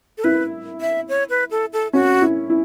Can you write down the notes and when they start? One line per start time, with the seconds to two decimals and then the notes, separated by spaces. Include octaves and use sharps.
0.18 A4
0.24 E4 B4
0.81 E5
1.09 C#5
1.30 B4
1.51 A4
1.73 A4
1.93 C#4 F#4
2.22 E4
2.50 E4